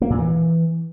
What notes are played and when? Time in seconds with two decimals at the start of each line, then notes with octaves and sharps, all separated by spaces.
0.02 A#3
0.10 A#2
0.19 E3